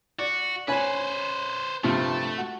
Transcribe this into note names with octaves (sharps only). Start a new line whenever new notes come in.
F#4 D5
C#4 B4 C5 G#5 B5
G2 C3 F3 A3
F#4